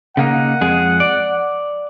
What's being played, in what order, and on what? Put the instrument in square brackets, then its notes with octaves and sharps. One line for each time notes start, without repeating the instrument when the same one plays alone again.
[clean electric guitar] C#3 A#3 D#4 [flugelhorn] F#5
[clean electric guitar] F2 G#3 G#4
D5